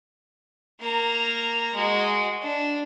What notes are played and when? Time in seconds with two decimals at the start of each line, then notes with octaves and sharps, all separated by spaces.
0.80 A#3 A#5
1.74 G#3 F#4
2.42 D4